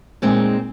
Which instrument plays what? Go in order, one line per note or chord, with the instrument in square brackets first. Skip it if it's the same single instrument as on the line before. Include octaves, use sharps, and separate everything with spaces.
[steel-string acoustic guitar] A#2 G#3 C4 D#4